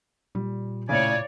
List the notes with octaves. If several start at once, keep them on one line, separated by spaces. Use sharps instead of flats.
A#2 G3
A2 C#3 C#5 D5 G#5